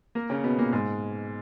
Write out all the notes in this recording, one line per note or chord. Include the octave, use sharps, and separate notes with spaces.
A#3 A#4
C#3 C#4
B2 B3
A#2 A#3
G#2 G#3